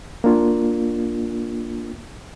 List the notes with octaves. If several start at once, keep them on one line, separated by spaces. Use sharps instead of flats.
A#3 D4 F4